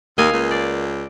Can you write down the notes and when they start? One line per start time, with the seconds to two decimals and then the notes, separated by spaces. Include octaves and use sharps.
0.18 D#2 A#3 D#5 F5 G#5
0.33 C#2
0.51 D5